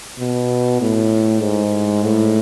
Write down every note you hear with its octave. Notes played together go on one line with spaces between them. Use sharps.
B2
A2
G#2
A2